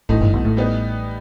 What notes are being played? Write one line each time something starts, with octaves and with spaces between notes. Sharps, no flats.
A1 A2 E3 A3 D#4
G1 G2
B1 B2
A1 A2
G3 B3 D#4